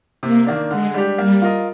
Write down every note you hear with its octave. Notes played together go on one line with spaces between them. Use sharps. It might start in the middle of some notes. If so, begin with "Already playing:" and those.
C3 A#3
D#3 A#3 D4
D3 G#3
G3 D4 G4
G3 A#3
F4 A#4 D#5